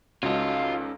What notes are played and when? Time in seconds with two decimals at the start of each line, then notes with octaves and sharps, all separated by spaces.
0.23 C#2 C#4 D#4 F4 F#4 A4 D#5